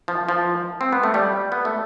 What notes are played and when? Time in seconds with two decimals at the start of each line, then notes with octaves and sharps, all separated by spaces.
0.08 F3
0.29 F3
0.81 C4
0.93 B3
1.03 A3
1.14 G3
1.52 B3
1.65 A3